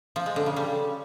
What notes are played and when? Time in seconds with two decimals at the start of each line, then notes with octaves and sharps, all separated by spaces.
0.16 F3
0.26 G#3
0.36 D3
0.46 C#3
0.56 G3